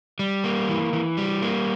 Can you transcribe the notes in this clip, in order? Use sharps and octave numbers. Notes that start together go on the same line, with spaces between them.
G3
A#3
E3
E3
G3
A#3